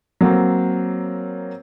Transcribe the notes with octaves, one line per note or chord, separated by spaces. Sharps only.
F#3 A#3 C4